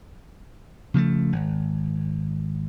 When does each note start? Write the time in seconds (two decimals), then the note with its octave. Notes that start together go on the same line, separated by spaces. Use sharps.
0.94 C#3 F3 G3 A3
1.32 G#1